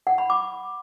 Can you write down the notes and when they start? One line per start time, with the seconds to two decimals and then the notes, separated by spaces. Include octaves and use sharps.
0.07 F#5
0.18 B5
0.30 D6